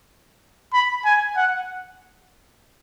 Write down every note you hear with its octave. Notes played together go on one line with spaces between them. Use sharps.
B5
G#5
F#5